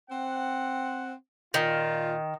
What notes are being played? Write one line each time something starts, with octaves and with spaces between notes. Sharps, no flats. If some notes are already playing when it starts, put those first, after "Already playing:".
C4 F#5
A#2 D#3 F4